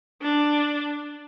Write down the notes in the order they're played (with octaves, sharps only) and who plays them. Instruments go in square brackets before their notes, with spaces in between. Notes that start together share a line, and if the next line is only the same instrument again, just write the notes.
[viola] D4